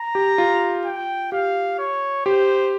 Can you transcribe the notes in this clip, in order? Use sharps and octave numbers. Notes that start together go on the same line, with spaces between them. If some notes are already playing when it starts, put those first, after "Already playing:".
Already playing: A#5
G4
F4
G5
G4 F5
C#5
G4 C5